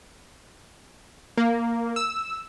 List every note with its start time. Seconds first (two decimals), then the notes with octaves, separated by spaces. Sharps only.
1.37 A#3
1.96 E6